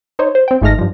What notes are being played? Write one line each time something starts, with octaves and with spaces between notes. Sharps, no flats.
D#4 C5 C#5
C5
C4 G5
G#1 G#2 A3 D#4 F6 A#6
G2 F3